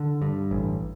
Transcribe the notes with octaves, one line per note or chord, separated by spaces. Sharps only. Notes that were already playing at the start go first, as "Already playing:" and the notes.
Already playing: D3
G2
A1